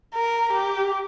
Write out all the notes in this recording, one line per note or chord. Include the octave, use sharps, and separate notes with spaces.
A#4
G4